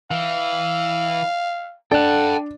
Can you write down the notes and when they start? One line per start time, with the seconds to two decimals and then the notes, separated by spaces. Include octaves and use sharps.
0.11 E3 F5
1.92 D4 A4 F#5 G5 A5